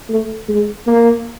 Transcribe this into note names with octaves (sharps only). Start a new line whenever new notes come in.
A3
G#3
A#3